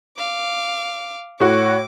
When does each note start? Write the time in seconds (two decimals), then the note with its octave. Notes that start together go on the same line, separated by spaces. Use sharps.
0.18 F5 D6
1.40 A2 F#4 C#5 D6